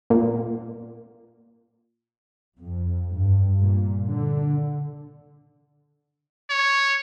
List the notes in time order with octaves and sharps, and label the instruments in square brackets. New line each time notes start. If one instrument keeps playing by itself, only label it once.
[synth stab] A#2
[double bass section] F2
G2
A#2
D3
[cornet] C#5